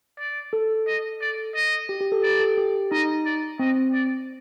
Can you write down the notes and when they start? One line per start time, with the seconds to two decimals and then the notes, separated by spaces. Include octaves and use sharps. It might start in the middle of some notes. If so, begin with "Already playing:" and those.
0.19 D5
0.53 A4
0.87 D#5
1.21 D5
1.55 D#5
1.89 G4
2.01 G4
2.12 A4
2.23 G4 D5
2.40 A4
2.58 G4
2.92 D#4 D#5
3.25 D5
3.59 C4 D#5
3.93 D5